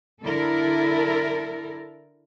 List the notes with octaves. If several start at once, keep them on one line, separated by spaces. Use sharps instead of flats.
D3 E4 A4 A#4